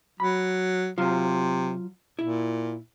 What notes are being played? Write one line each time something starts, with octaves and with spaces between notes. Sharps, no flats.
F#3 B5
C3 F#3 F4
A#2 E4